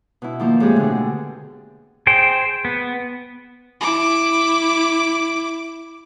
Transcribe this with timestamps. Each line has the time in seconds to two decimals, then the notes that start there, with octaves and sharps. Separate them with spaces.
0.22 B2 E4
0.40 D#3 F3 A#3
0.60 A2 G#3 C4 G4 G#4
0.76 B2 D3
2.07 G#4 C5 G5
2.65 B3
3.81 E4 D6